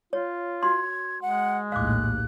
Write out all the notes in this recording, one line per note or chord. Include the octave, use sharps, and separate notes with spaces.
F4 C#5
F#4 C6 G#6
G#3 F#5
A#1 D#2 A2 F5 D6 F#6